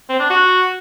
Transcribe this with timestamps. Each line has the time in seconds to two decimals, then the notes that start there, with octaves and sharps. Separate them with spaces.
0.09 C4
0.20 D4
0.30 F#4